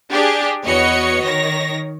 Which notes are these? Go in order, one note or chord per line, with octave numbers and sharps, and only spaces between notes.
D4 G4 G#4
E2 F#4 B4 C#5 D#5 C#7
D#3 C#5 A#6